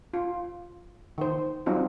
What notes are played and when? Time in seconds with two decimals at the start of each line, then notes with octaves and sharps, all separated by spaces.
0.14 F4
1.18 D#3 C5
1.66 F#3 G3 C4 D#4 F4